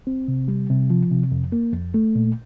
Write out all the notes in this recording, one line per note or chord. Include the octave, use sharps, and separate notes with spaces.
C4
C3
G3
C3
F3
C3
F2
A#3
F2
A3
A#2